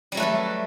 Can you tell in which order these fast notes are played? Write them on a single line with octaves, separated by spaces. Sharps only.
G3 F#3 A3 B4 A4